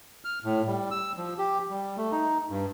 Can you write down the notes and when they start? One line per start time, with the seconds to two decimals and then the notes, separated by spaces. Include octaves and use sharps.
0.25 F6
0.44 A2
0.67 G3
0.91 E6
1.17 F3
1.38 G4
1.70 G3
1.97 A3
2.12 D#4
2.50 G2